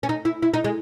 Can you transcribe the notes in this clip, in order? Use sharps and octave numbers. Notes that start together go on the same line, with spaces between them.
C#4
D#4
E4
E4
D#4
G#3